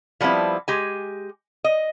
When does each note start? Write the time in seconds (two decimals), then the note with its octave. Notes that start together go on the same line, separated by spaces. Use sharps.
0.20 F3 G3 B3 C4 E4
0.68 G#3 G4 G#5
1.64 D#5